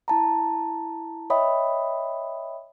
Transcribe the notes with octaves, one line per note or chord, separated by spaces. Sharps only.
E4 A5 A#5
C#5 D#5 E5 G5 B5 D#6